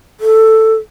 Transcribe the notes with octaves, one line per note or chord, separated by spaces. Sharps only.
A4